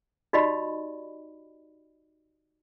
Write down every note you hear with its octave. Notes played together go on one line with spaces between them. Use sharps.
D#4 F#4 G4 D5 D#5 B5